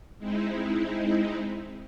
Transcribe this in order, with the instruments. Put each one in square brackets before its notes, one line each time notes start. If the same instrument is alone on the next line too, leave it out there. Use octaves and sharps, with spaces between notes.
[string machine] G#3 C4 D#4 E4